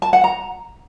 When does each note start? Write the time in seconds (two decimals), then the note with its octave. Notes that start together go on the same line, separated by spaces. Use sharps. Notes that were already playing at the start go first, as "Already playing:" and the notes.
0.02 A5
0.13 F#5
0.24 A#5